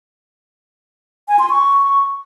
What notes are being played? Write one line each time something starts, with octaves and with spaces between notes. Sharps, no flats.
G#5
C6
C#6